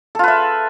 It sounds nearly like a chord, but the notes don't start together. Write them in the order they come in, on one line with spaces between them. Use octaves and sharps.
A4 F4 B4 E5